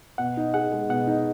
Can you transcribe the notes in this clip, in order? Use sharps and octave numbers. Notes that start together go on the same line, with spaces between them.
B2 F#5
D#4
G#4 F#5
G#3
B2 F#5
D#4